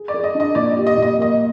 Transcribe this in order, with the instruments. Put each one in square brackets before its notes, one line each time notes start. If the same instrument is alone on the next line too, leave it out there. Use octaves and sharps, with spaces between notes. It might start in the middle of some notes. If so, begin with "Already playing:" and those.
Already playing: [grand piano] G#4
[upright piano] D5
[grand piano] G#4
[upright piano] D#5
[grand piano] D4
[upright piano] D#5
[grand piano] A#2 [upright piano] D5
[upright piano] D#5
[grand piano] G4
[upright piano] D#5
[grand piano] A#2
[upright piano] D#5
[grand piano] A#3 [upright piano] D#5